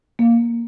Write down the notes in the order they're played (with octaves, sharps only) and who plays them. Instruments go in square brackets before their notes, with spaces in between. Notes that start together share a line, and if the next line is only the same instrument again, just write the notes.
[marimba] A#3